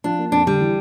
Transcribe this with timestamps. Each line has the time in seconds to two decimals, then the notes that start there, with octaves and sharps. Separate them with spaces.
0.04 F3 D4
0.19 A#3
0.32 F2 D4
0.46 D3 G3
0.60 E3